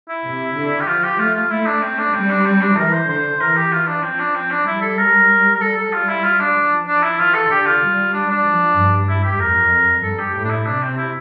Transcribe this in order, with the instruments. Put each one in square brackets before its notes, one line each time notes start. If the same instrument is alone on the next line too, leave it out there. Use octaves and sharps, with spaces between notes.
[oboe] E4
[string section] C3
D3
[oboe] G4
[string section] F3 [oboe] F4
[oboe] G4
[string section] A3 [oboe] F4
[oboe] F4
[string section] A3 [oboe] E4
[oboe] D4
C4
D4
[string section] G3 [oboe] C4
[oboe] D4
C4
D4
[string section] E3 [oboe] A#4
[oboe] C5
[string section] D3 [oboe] C5
[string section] E3 [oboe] A#4
[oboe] G4
F4
D4
[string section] F3 [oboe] C4
[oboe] D4
C4
D4
[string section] G3 [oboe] E4
[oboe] A4
A#4
A#4
[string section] G3 [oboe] A4
[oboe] A4
[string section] G3 [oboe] F4
[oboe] E4
F4
D4
[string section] F3
[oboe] D4
E4
[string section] E3 [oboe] F4
[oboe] A4
[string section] D3 [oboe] G4
[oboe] F4
[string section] G3
[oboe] D4
D4
[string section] F3
G2
[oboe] E4
G4
[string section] F2 [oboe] A#4
[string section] G2 [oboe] A4
[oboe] G4
[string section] A2 [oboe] G4
[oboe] D4
E4
[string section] C3 [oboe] D4
[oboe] C4
E4